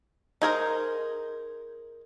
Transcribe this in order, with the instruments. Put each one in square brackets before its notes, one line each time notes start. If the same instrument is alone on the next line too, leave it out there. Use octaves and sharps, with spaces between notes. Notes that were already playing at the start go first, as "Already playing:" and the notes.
[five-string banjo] D#4 G#4 A#4 C5